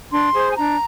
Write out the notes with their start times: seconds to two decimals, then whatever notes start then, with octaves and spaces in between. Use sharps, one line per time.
0.11 D4 C6
0.34 G#4 C5
0.51 G#5
0.56 D4 A#5